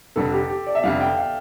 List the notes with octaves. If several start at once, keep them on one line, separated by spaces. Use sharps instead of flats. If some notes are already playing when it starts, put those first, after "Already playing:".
F1 F2 D3 G3 D4 A4
G4
G4
D5
E5
F1 F2 D3 G3 D4 F5
G5
F5